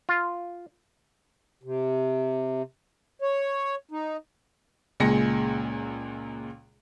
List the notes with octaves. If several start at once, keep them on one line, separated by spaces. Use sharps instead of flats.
F4
C3
C#5
D#4
C#2 A#2 G#3 A#6 C#7